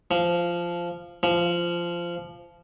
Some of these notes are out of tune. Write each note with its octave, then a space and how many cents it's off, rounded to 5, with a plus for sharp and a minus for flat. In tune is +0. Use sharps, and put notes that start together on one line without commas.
F3 -10
F3 -15